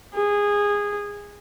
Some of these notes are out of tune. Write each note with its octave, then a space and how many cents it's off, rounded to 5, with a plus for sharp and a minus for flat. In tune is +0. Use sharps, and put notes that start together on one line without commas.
G#4 -15